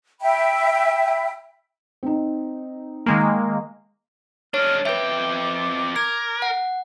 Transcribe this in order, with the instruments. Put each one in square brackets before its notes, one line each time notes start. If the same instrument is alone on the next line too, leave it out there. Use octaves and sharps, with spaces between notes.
[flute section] E5 G5 B5
[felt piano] C4 D#4
[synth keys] D#3 G#3 A#3
[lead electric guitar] G#3 D4 [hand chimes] C#5 [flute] F6
[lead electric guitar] F2 G5 [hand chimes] B4 E5 [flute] D6
[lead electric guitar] A#4 [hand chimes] G#6
[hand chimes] F#5